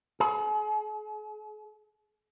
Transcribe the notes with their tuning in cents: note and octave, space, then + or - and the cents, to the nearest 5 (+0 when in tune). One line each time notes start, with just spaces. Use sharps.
G#4 +40